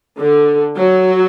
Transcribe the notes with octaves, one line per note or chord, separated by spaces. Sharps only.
D3
F#3